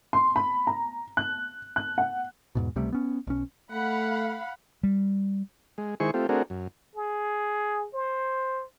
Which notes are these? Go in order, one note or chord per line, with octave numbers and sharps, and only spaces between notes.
C6
B5
A#5
F#6
F#6
F#5
E2 G#2 B2
C#2 C3 G3 A3
B3 C#4
B1 C#4
A3 F5 F#5 B5
G3
G#3
D#3 G#3 E4 G#4 C5 C#6
A3 C4 F4 G4
A3 C4 D4 F#4 G#4 A#4
F#2
G#4
C5